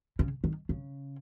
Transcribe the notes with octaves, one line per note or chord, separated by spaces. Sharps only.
C#3
D#3
C#3